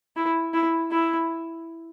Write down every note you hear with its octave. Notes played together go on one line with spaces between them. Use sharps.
E4
E4
E4